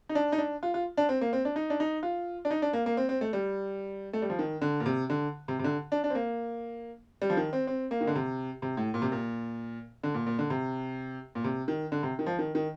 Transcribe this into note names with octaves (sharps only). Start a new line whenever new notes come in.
D#4
D4
D#4
D4
F4
F4
D4
C4
A#3
C4
D4
D#4
D4
D#4
F4
D4
D#4
D4
A#3
A#3
C4
C4
A3
G3
A3
G3
F3
D#3
D3
A#2
C3
D3
C3
C3
D3
D4
D4
C4
A#3
G3
F3
D#3
C4
C4
A#3
D#3
D3
C3
C3
A2
A#2
C3
A#2
D3
A#2
A#2
D3
C3
A#2
C3
D#3
D3
C3
D#3
F3
D#3
D#3